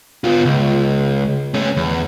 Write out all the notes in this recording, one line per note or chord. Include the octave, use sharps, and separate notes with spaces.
B3 F4
C#2
A3 C#4
E2